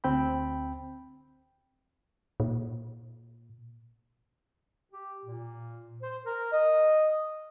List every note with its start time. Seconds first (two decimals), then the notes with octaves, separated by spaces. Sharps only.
0.04 D2 C4 G5 B5
2.40 A#2
4.92 G4
5.26 A#2
6.02 C5
6.26 A#4
6.52 D#5